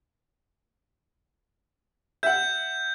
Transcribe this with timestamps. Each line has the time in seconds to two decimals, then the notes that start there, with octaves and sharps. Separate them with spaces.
2.23 E5 F#5 G6